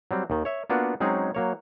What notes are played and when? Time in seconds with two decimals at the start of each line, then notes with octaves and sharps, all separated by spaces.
0.11 F#3 G3 C4
0.30 D#2 D#3
0.45 C#5 E5
0.70 A#3 B3 D4 F4 F#4
1.00 F#3 G#3 C4 C#4 D#4 G#4
1.35 F#3 A#3 C#5